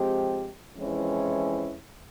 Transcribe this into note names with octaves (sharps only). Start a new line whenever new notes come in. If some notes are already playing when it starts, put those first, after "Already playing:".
Already playing: F3 G#3 C4 G4
F2 E3 G#3 C#4 E4